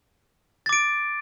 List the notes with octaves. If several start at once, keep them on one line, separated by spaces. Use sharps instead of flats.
D6 A6 D7